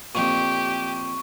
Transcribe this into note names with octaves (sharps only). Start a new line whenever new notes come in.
F2 A#2 G4 C#6